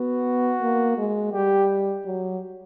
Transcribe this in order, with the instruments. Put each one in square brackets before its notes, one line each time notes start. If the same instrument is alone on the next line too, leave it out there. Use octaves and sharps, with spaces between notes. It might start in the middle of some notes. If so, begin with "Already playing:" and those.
Already playing: [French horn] B3 [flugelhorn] F#4
[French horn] A#3
G#3
[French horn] G3 [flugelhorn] G4
[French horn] F#3